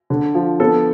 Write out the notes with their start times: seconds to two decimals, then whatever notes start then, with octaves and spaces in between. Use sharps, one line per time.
0.10 D3
0.35 F3
0.60 B3 A4